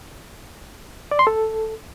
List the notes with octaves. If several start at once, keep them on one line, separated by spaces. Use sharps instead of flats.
D5
C6
A4